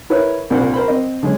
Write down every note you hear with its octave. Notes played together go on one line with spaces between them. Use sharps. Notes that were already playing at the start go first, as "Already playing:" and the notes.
E4 A#4 B4 C#5
C2 A#2 D4 A#4 C5 F#5
A#4 C5 B5
C4 D#5
D3 G#3 C#4